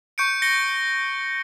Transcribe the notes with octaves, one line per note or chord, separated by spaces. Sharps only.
C#6 G6 C#7 D7
A#6 C#7 G7